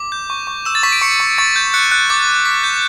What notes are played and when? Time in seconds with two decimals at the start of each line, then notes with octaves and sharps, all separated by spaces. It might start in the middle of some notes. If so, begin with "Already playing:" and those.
Already playing: D6
0.12 G6
0.30 C#6
0.47 C#6
0.65 E6 E7
0.75 A6
0.83 C#6 B6
0.92 D7
1.02 C#6 C#7
1.20 C#6
1.38 C#6 A6
1.56 G6
1.74 F#6 C#7
1.92 F#6
2.10 D6 A6
2.28 D6
2.45 D6 B6
2.63 G6 A6